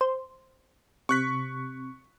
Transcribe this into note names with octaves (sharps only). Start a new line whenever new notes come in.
C5
C3 C#6 F#6 B6